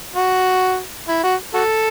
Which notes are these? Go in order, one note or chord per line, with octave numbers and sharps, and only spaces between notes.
F#4
E4
F#4
F#4 A4